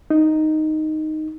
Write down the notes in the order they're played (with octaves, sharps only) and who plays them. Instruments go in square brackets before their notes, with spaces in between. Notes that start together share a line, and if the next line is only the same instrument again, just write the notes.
[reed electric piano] D#4